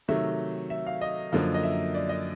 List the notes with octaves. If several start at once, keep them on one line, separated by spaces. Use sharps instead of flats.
C3 D#3 F#3 A3 E5
E5
F5
D#5
F#2 D3 F3 A#3
D#5
E5
D5
D#5